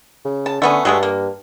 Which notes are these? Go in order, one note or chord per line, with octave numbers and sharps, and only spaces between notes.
C#3
A5
D3 A3 B3 C#4
G2 F#3 G#3 A3
A#3